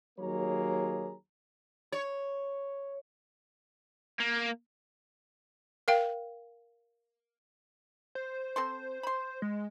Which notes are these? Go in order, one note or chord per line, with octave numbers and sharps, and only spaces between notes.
D#2 F#3 A#3 G#4 C#5 A#5
C#5
A#3
A#4 F5 G5
C5
C4 A4 C6
B5 C6
G#3